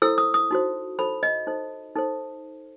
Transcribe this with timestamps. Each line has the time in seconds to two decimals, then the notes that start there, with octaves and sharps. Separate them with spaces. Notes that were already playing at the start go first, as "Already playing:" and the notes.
0.02 E4 A4 C5 E6
0.18 D#6
0.34 D#6
0.51 D#4 F#4 C5
0.99 D#4 A4 C5 B5
1.23 D#5
1.47 D#4 A4 C5
1.96 D#4 A4 C5